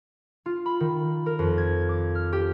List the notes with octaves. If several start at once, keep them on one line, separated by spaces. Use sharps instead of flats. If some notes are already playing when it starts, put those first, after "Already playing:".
F4
B5
D#3
A#4
F2
G#6
D6
F6
G4